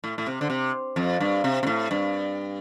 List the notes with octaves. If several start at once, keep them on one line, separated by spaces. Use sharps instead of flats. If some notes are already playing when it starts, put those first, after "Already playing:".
A2
A2
C3
D3
C3
F2
G2
C3
C3
A2
G2